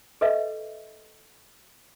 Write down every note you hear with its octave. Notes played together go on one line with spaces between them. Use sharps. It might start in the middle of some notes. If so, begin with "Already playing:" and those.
A4 B4 D#5 E5